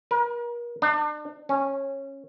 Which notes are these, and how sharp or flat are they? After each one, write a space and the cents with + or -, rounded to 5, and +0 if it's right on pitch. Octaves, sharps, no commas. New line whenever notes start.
A#4 +40
D4 +35
C#4 -15